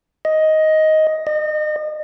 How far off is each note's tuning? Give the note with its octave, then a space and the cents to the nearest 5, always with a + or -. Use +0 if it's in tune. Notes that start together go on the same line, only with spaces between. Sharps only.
D#5 +10
D#5 -35